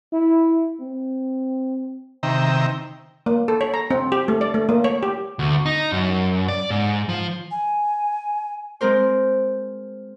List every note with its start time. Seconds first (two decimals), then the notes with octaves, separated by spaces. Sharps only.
0.13 E4
0.80 C4
2.23 C3 D#3 E5 G5 A#5
3.26 A#3
3.48 A4
3.61 C#5
3.74 A#5
3.90 C4
4.12 G4
4.28 A3
4.41 D5
4.54 A3
4.69 A#3
4.84 C#5
5.03 G4
5.39 D2
5.66 D#4
5.92 F#2
6.48 D5
6.70 G#2
7.09 F3
7.51 G#5
8.81 G#3 C4 A#4 C5